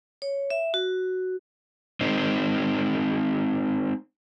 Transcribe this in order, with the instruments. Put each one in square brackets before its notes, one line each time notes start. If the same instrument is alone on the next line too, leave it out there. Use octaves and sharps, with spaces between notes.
[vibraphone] C#5
E5
F#4
[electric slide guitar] G#3 C4 D#4